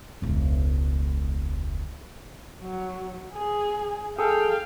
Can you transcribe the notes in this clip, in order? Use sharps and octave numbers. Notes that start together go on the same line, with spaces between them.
E1 C#2
F#3
G#4
G#4 A4 F5 G5